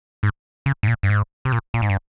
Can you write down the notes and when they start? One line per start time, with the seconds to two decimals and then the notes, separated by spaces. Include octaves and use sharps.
0.23 G#2
0.66 C#3
0.83 G#2
0.88 A#2
1.03 G2
1.10 G#2
1.45 C3
1.52 A#2
1.74 A#2
1.82 G#2
1.89 G2